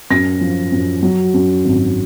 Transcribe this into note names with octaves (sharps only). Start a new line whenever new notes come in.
F#2 A#6
F3
F#2
F#3
F#2
G#1